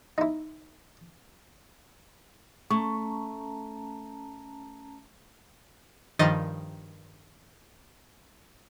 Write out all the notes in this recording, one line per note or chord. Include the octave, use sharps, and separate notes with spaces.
D#4 E4
A3 C#4 A5 A#5 C#6
G2 D#3 F3 D#5 A6